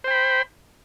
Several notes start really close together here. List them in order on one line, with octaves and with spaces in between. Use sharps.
C5 G5 B5